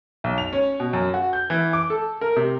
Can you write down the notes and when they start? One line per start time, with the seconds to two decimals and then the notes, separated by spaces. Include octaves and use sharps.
0.24 B1
0.38 F7
0.53 C#4
0.80 B2
0.93 F#2
1.14 F#4
1.33 G6
1.50 E3
1.73 D6
1.90 A4
2.21 A#4
2.36 C3